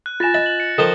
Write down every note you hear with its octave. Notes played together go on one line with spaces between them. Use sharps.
F#6
F4 G#5 A6 A#6 E7
D#5 B5
F#6 F#7
C#7
D#3 F3 A4 C5